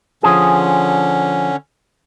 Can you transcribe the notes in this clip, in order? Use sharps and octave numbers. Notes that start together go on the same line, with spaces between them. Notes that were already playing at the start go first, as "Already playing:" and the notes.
D3 F3 C#4 G#4